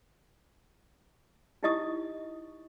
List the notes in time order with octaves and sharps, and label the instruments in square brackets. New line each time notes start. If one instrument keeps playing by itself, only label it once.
[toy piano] D#4 E4 G4 D#5 C#6 D#6